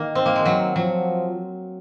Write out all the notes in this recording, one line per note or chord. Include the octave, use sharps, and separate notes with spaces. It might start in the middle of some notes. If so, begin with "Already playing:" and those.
Already playing: D#3 A#3
C4
A#3
G#3
F#3
F3 F#3